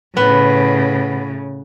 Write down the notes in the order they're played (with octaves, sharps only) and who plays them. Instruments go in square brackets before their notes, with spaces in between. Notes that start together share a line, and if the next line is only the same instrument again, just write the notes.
[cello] A2 C#3 [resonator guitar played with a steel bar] B3